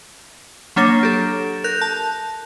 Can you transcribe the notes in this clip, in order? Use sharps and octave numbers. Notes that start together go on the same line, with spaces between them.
F#3 A#3 D4 C#5 A#6
G4 A4
A#4 F#6 G6
A5